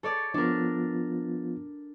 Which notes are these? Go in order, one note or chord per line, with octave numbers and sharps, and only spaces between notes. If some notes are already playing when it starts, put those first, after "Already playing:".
A4 C#5 D5
F3 B3 D4 F4 A#4